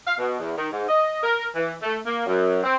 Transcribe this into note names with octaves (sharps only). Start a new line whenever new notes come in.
F5
B2
E2
D#3
G#2
D#5
A#4
E3
A3
A#3
F#2
C4